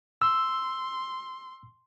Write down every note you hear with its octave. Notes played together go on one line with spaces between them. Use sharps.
C6 E6